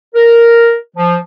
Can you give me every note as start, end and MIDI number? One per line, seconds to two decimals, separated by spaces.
0.15 0.75 70
0.97 1.16 53